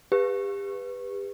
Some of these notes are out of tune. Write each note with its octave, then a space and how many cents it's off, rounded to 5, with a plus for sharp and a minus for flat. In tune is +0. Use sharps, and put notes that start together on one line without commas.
G4 +40 B4 +0